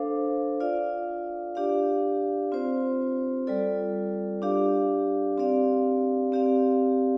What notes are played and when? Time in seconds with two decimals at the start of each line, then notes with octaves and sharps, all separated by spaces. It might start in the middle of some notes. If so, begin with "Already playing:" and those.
Already playing: D4 A4 C5 F5
0.60 F4 D5 F5
1.55 D4 G4 D5 F5
2.52 C4 F4 C5
3.47 G3 F4 A4 D5
4.42 D4 G4 D5 F5
5.38 C4 G4 D5 F5
6.32 C4 G4 D5 F5